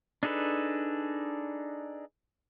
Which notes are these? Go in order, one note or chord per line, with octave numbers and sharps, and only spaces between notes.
D4 D#4 G#4 A4 B4